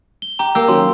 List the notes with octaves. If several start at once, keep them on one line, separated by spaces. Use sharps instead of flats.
G7
G4 A#5
A#3 G4 E6
D#3 F#3 C#4 C6